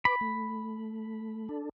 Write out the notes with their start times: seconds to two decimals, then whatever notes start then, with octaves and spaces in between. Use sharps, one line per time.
0.05 B4 B5 D6
0.21 A3
1.49 D4 A4